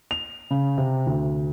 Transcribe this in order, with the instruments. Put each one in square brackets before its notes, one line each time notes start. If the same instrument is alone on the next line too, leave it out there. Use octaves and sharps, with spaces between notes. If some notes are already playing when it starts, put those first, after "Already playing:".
[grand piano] F7
C#3
C3
D2